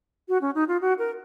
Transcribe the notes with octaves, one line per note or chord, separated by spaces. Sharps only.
F#4
C#4
D#4
F4
F#4
A#4